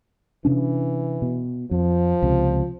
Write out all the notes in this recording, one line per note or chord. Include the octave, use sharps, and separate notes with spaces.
C3 E3 C#4 D4
B2
F2 F3
C#2 C3